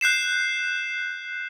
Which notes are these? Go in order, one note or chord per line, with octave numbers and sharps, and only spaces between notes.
F#6 G6 C7 E7